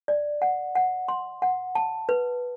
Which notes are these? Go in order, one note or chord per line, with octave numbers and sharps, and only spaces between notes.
D5
F#5
F#5
C6
F#5
A5
B4